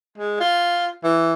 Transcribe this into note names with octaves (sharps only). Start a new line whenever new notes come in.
G#3
F4
E3